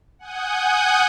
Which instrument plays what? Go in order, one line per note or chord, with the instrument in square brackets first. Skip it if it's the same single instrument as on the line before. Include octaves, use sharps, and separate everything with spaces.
[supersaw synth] F#5 G#5 D#6 G6